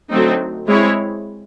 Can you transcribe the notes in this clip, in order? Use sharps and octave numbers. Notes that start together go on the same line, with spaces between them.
D3 F#3 A3 C4 D#4
G#3 C4 E4 G#4 C#5